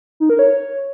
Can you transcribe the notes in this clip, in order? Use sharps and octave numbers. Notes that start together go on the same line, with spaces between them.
D#4
A#4
C#5